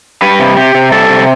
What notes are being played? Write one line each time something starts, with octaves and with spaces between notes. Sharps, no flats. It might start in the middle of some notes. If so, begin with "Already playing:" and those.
G3 B4
C3
C3 G4
C3
G3 A4
C3